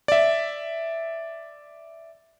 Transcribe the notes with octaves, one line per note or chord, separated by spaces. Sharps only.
D5 E5